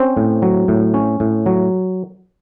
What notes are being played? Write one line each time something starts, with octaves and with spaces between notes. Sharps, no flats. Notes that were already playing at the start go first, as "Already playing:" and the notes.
Already playing: C4 C#4 C5
A2
F#3
A2
C#4
A2
F#3